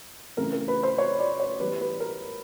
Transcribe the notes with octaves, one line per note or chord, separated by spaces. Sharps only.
C#3 E3 A3 C4 A#4
A#4
B4
C5
C#5
D5
C#5
E3 G3 B3 B4
B4
A#4